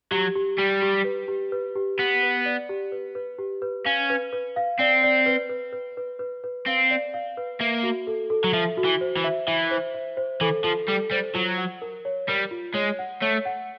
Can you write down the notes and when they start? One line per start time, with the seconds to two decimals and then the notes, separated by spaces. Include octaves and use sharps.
0.11 F#3 G4
0.36 G4
0.58 G3 G4
0.82 G4
1.05 B4
1.28 G4
1.52 B4
1.75 G4
1.99 B3 G4
2.23 B4
2.46 D5
2.69 G4
2.92 B4
3.15 B4
3.39 G4
3.62 B4
3.85 C#4 F5
4.10 B4
4.33 B4
4.56 F5
4.79 C4 D5
5.03 D5
5.26 B4
5.49 B4
5.72 B4
5.97 B4
6.19 B4
6.44 B4
6.66 C4 F5
6.91 D5
7.14 F5
7.37 B4
7.60 A#3 E5
7.83 F#4
8.07 A4
8.30 A4
8.44 F#3
8.53 F3 E5
8.77 F#4
8.85 E3
9.01 C5
9.17 E3
9.24 E5
9.47 E3 E5
9.71 C5
9.94 E5
10.17 C5
10.41 E3 A4
10.64 F3 A4
10.88 G3 A4
11.11 G3 C5
11.34 F#3 F4
11.57 F#5
11.82 A#4
12.05 C#5
12.28 G3 A#4
12.51 F4
12.74 G#3 C#5
12.99 F#5
13.21 A3 C#5
13.45 F#5